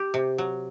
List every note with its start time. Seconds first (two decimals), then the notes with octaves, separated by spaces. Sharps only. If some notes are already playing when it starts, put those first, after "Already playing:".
Already playing: G4
0.14 C3
0.38 F#3